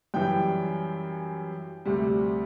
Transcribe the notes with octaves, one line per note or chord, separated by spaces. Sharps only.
F#2 E3 G3 G5
D2 C3 G3